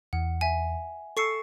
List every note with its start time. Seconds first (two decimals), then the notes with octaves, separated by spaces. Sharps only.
0.13 E2 F#5
0.41 E5 G#5
1.17 A4 C#6 E6 C7 C#7